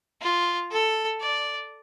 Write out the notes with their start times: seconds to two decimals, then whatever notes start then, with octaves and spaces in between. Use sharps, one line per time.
0.21 F4
0.71 A4
1.20 D5